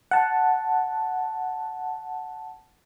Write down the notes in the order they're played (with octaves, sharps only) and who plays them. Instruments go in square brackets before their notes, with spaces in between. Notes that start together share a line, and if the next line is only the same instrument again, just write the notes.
[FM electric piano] F#5 A5